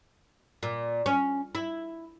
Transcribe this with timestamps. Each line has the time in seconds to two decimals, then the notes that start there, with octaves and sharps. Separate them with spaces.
0.63 A#2
1.06 C#4
1.55 E4